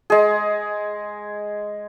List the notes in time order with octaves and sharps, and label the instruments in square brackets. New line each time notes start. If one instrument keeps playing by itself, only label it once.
[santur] G#3 G#4